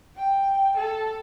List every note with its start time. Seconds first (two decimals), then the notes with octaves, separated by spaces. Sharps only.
0.16 G5
0.77 A4